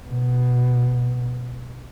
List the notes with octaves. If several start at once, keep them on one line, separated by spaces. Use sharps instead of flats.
B2